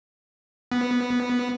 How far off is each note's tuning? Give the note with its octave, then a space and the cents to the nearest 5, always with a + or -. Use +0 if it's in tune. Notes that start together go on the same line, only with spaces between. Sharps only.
B3 -5